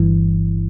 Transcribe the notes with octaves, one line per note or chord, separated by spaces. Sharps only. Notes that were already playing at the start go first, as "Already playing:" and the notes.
Already playing: G1 G2 E3